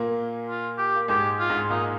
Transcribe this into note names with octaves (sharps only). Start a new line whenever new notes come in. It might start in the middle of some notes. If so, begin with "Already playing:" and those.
Already playing: A#2 A#3
F4
G4
A#3
G#2 G#3 G4
F4
G#2 G#3
A#2 A#3 D#4